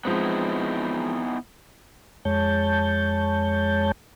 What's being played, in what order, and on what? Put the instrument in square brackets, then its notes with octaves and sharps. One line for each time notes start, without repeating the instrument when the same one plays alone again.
[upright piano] F3 G#3 C4 [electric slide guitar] B3 D#4 E4
[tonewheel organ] F2 G#3 C#5 A5 G6